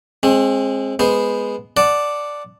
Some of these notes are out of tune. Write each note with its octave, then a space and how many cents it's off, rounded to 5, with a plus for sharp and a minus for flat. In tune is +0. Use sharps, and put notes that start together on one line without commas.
G#3 +5 C4 +30
G#3 +0 B3 +0 C5 +0
D5 +0 F#5 +0 A5 +0